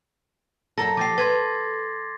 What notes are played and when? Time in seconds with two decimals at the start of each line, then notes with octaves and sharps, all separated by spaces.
0.78 F#2 A4 A#4 A#6
0.97 F3 G4 D6 A6 C7
1.18 B4 C6 G#6 A6